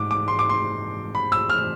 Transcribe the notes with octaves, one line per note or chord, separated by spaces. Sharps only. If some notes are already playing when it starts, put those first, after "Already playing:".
Already playing: G#2 D6
D6
C6
D6
C6
B5
E6
F6